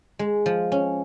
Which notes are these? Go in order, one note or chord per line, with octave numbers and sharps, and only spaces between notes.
G#3
F3
C#4